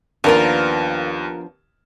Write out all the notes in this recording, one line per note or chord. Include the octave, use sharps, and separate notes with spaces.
D#2 F3 B3 D4 F4 A#4 F5